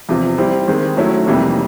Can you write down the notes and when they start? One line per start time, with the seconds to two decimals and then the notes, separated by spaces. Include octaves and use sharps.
0.09 E2 C3 F3
0.38 G3 C4 E4
0.68 D#3 G#3 C4
0.97 F#3 A3 C#4 E4
1.27 F2 C3 E3 G3 A#3